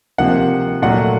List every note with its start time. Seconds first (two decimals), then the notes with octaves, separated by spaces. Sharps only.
0.18 C3 F3 A#3 F#5
0.82 A#2 F#3 A3 F#5